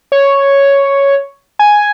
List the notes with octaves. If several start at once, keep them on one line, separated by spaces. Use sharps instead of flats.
C#5
G#5